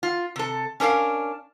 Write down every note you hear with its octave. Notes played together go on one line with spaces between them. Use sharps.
F4
C3 A4
C#4 D4 A#4 D#5 F5